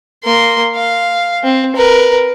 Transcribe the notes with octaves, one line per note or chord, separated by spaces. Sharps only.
A#3 C6
F5
C4
A#4 B4